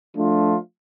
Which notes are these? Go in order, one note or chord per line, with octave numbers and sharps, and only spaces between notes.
F3 A3 D4 F4